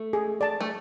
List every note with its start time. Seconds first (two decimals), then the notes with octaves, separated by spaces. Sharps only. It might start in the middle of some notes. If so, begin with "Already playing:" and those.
Already playing: A3
0.13 G#4
0.41 D5 A5
0.61 A3